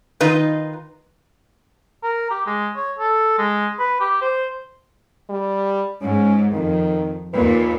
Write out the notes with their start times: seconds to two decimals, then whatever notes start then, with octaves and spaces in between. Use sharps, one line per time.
0.21 D#3 D#4 F4 B4
2.03 A#4
2.31 G4
2.46 G#3
2.76 C#5
2.99 A4
3.38 G#3
3.79 B4
4.00 G4
4.22 C5
5.30 G3
6.02 G#2 C#4
6.53 F2 D#3
7.34 D#2 A#2 B4